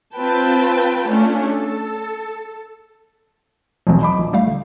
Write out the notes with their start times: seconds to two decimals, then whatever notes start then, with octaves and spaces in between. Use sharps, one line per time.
0.15 C4 F4 B4 G5 A5
1.08 A3 C#4 D4 F4
1.48 A4
3.87 E1 B1 F#2 F3 F#3 C4
4.01 D#5 B5 D6
4.18 A#1
4.33 G3 A3 F5
4.47 D3